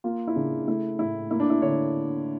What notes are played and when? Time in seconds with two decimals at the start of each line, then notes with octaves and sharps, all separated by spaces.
0.04 A#3 F4
0.27 E4
0.36 C#3 D4
0.67 A3 E4
0.99 A2 E4
1.31 A#3 E4
1.40 D4
1.50 E4
1.62 D3 C#5